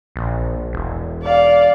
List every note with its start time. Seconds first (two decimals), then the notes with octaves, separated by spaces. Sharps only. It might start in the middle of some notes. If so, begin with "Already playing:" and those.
0.16 A#1
0.73 E1
1.23 D5 F5